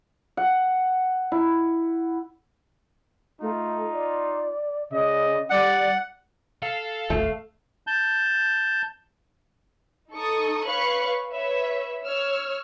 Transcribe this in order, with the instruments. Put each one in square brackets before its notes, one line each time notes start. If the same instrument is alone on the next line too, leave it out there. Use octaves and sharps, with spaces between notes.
[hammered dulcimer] F#5
E4
[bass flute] A3 [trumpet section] D#4 F4
[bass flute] D5
[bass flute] C#3 [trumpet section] D5 D#5
[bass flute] G3 [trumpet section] D5 [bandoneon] F#5
[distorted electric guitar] A4 [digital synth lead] F5
[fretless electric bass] D1 G#1 D2 [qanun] A3
[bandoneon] A5 G6
[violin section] D#4 A4 C#6 D#6
B4 C#5 F5 C#6 F#6
B4 C#5 E5
C#5 E6 F6